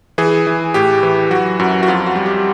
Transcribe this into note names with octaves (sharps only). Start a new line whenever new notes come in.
E3 G#4
E3
A2 G4
E3
F#3 F#4
F#2 F#4
F#4
F2 F4
F#4
G3
G4